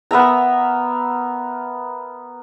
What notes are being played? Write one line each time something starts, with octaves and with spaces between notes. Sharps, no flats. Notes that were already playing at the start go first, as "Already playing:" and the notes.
B3 A#4 E5 A#5